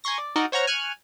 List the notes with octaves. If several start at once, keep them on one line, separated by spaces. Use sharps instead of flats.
G#5 A#5 C6 C#6 A#6
D5
D#4 F#4 A#4 D5 D#5
C5 C#5 F#5 A#5 F6
G#5 C#6 F6 F#6